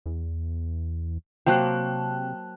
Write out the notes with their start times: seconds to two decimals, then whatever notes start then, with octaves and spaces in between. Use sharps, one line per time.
0.06 E2
1.46 C3 F#3 A#3 C5 G5 A5 F#6